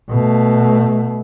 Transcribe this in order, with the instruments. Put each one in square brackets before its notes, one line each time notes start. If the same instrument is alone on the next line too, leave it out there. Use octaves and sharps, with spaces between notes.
[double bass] B2 A3